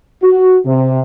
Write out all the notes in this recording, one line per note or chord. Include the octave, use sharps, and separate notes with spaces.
F#4
C3